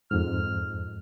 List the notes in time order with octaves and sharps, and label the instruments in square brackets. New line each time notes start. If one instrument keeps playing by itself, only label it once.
[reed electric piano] F2 G#2 [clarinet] F6